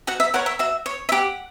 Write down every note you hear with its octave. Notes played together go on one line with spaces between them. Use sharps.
F#4 F#5
E5
A#4 C#5 F#5
E5
F#4 E5
C#5
E5
G4 F#5